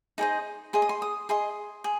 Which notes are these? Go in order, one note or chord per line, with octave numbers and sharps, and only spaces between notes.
D#4 G#4 C5 D#5
G#4 D#5 C6
D#6
C6
D#6
G#4 D#5 C6
G#4